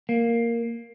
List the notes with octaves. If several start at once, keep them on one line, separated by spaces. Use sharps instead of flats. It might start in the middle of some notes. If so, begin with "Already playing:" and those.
A#3